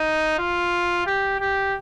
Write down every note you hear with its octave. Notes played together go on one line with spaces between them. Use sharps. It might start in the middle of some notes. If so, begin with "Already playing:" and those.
Already playing: D#4
F4
G4
G4